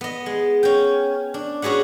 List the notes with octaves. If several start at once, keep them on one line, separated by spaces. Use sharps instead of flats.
B3 D#5
G#3
C#4 G5
D4
C#4 F#4 G#4 B4 F#5